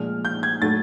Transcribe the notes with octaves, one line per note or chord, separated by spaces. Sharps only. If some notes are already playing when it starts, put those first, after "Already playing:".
Already playing: A#2 F3 G#3 F6
G6
G#6
A2 F#3 A3 A6